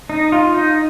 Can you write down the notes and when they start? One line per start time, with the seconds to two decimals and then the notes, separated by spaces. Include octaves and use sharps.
0.10 D#4
0.32 F4
0.55 D#4